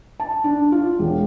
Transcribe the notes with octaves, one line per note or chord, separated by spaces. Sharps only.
A5
D4
F4
E1